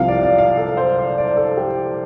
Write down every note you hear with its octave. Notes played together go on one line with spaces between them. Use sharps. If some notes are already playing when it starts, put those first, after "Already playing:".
Already playing: C2 C3 F3 F5
D5
D5
F5
A4
C5
D5
D5
A4
G4